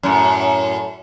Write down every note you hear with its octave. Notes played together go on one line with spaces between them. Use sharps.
F#2 A2